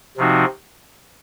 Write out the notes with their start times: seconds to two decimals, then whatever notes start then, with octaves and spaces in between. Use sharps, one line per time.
0.17 C3 F3 C4 D#4 F#4